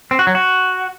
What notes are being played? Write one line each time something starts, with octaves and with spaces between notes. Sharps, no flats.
C4
F#4
F#3
F#4